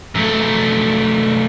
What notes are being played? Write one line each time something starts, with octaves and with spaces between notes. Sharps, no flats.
F#2 A3